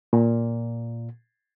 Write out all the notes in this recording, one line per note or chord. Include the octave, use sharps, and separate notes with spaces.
A#2